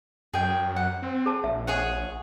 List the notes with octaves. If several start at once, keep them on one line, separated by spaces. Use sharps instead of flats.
F#2 G#4 G5
F#5
C4
G#4 A5
A#1 E5
G#4 C#5 F#5